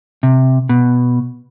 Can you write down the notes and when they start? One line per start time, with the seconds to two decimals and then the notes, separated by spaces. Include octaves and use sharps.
0.23 C3
0.69 B2